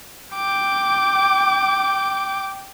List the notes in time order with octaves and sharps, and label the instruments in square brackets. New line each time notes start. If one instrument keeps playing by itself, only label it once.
[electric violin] G5 D6